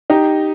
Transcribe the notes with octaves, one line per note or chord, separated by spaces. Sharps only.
D#4 G4